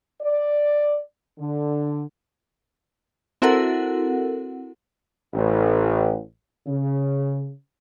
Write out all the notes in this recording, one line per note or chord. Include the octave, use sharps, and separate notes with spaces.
D5
D3
C4 E4 F#4 A4 A#4 F#5
A1
C#3